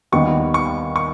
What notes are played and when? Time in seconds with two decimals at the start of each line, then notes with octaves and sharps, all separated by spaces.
0.12 D#2 D#3 G3 B3 C#6
0.54 C#6
0.96 C#6